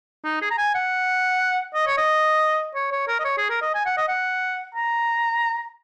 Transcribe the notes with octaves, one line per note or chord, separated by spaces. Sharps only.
D#4
G#4
A#5
G#5
F#5
D#5
C#5
D#5
C#5
C#5
A#4
D#5
C#5
G#4
A#4
D#5
G#5
F#5
D#5
F#5
A#5